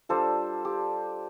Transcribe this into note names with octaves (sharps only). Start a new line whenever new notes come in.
G3 D4 F4 A4 C5
G4